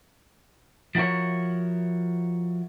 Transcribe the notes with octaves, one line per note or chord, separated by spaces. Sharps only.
F3 E4 F#4 A#4 C#5